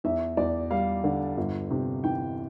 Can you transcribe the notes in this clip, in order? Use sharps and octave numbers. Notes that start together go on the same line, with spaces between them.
E2 E5
E2 D5
G3 F5
D3
G1
C3
E3 G5